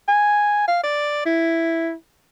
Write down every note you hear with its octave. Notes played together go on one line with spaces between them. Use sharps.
G#5
F5
D5
E4